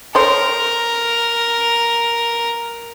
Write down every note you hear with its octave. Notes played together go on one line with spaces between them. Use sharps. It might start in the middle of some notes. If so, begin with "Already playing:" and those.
A4 A#4 C5 C#5